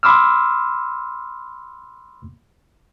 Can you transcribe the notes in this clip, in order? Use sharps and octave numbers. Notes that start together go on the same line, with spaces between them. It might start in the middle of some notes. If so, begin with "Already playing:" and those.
B5 C6 D6 E6 F6